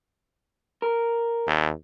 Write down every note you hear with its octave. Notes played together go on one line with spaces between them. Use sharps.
A#4
D#2